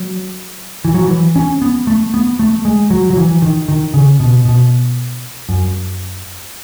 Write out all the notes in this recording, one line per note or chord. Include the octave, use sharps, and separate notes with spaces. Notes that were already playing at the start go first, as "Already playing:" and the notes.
Already playing: F#3
E3
F#3
E3
C#4
B3
A3
B3
A3
G#3
F#3
F#3
E3
D#3
D#3
C#3
B2
B2
F#2